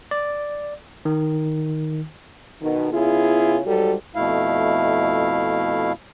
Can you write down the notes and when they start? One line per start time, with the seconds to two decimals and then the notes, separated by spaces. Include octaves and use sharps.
0.11 D5
1.05 D#3
2.62 B2 D#3
2.92 C#3 B3 E4 F4 G#4
3.66 G#2 F#3 G3 F#4 A4
4.15 F2 B2 A3 E4 F5